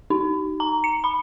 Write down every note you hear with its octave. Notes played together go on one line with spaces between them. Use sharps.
D#4
A#5
C#7
B5